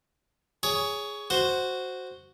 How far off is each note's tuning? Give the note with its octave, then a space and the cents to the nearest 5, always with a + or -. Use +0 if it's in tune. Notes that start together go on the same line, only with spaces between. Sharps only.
G#4 +0 C#5 +15
F#4 +0 C5 +0